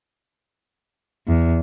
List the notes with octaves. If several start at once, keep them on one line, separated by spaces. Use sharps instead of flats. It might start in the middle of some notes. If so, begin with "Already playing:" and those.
E2